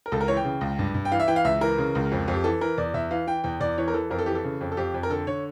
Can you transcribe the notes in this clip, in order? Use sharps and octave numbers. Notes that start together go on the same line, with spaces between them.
A#4
C#2 A4
A#4
E3 C#5
G5
C#3
C#2
G2
G2
G5
E3 F5
E5
E3 G5
F5
C#2 E5
E3 A#4
C#3
C#2
F2
F2
G4
E3 A4
E3 A#4
E2 D5
E2 E5
E3 F5
E3 G5
E2 G5
E2 D5
E3 C#5
A#4
E3 A4
F2 A#4
A4
E3 G4
A4
C#3
F2
A4
F2 G4
F2
A#4
D3 A4
D3 C#5